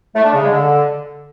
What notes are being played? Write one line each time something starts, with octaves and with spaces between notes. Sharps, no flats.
A3
D4
C#3
G#3
D3